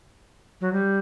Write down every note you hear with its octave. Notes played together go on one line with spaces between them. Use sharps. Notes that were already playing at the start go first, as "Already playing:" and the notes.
F#3
G3